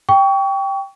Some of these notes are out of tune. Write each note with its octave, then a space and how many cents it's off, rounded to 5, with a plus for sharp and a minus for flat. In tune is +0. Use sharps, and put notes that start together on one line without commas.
G5 +0 C#6 +30